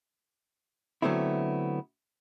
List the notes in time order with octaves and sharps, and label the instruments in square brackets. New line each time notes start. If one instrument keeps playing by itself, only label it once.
[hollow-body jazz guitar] D3 F#3 A3 B3 C4 E4